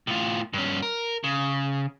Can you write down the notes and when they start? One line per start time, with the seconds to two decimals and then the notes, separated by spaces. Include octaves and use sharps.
0.07 A2 F4
0.53 G2 C#4
0.82 A#4
1.24 C#3